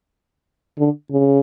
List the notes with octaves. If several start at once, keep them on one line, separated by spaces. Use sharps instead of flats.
D3
C#3